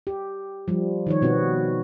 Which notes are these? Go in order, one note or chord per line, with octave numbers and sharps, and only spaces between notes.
G4
F3 G3
D#3 F3 C#5
B2 B3 C4 F#4